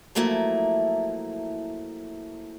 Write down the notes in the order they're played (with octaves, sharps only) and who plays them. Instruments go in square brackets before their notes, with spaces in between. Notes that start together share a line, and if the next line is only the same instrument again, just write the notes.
[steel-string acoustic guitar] F3 F#3 A3 A#3 E4